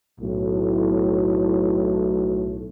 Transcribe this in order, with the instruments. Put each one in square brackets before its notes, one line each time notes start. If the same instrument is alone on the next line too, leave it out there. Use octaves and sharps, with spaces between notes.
[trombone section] B1 A2